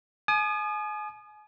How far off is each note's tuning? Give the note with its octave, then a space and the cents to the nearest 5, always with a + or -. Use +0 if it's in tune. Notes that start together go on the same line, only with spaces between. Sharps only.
G#5 +35 D#6 -35